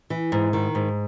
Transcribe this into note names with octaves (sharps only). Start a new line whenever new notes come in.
E3
G#2
D#3
G#2